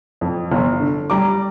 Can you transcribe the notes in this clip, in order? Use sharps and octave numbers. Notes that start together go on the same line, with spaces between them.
F2
G1
D3
G3 A#5 D6